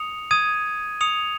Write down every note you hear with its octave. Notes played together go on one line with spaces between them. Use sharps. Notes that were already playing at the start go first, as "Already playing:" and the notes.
Already playing: D#6 C#7 F7
D#6 G#6 D#7
D#6 C#7 F7